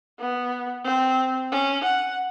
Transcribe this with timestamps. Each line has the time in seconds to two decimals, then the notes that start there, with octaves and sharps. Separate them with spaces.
0.19 B3
0.84 C4
1.52 C#4
1.84 F#5